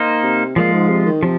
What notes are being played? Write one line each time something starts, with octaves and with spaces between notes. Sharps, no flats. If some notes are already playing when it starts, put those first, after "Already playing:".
Already playing: A#3 D#4 C5
C3
A#2 F3 G#3 F4
G#2
C3
D#3
C3 F3